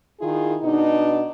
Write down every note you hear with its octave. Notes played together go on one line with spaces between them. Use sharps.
D#3 E4 F4 G#4
B2 D4 D#4